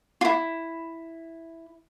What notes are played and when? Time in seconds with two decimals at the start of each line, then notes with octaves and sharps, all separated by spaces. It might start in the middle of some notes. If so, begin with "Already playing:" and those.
0.21 E4 F4